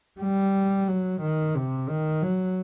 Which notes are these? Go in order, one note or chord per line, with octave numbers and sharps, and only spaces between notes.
G3
F#3
D#3
C3
D#3
F#3